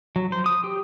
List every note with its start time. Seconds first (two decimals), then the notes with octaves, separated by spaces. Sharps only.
0.16 F#3
0.32 C5
0.46 D#6
0.64 G4